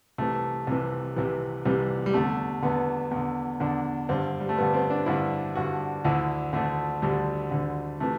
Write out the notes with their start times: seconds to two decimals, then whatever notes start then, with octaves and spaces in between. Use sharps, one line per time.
0.18 C2 C3 E3 A3
0.67 C2 C3 E3
1.16 C2 C3 E3
1.65 C2 C3 E3 G3
2.06 G3
2.14 E2 D3 A3
2.62 E2 D3 B3
3.11 E2 D3
3.60 E2 D3 D4
4.09 G2 D3 C4
4.40 G3
4.49 A3
4.57 G2 D3 B3
4.74 C4
4.90 D4
5.06 G2 D3 E4
5.55 G2 D3 F#4
6.05 D2 D3 E4
6.53 D2 D3 A3
7.02 D2 D3 G3
7.51 D2 D3
8.00 C3 E3 A3